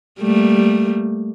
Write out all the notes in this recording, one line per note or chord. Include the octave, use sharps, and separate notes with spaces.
G3 A3 A#3